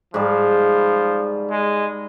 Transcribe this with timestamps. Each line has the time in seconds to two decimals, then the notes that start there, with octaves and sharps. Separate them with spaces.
0.14 G#2 F3 G3
1.51 G#3